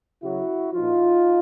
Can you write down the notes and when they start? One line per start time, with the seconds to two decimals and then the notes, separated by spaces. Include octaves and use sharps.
0.23 C#3 F#3 E4 F#4
0.74 A#2 F3 D#4 F4